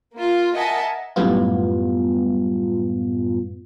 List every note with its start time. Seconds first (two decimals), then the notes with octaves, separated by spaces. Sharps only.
0.14 A#3 F4
0.55 A#4 D#5 E5 F#5 G#5 A5
1.16 F#2 A2 G3 B3 F4